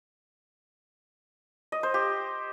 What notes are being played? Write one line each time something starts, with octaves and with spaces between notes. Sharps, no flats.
D#5
C5
G4